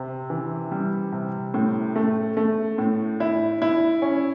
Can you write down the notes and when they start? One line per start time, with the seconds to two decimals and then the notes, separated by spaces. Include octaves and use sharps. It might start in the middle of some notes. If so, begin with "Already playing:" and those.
Already playing: C3
0.30 E3
0.72 G3
1.12 C3
1.54 A2
1.96 A3
2.37 A3
2.78 A2
3.20 E4
3.62 E4
4.02 C#4